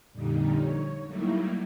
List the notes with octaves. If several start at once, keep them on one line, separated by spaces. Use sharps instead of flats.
F2 A#2 D3 G3 D#4
C#5
F#3 G3 A3 A#3 D#4 E4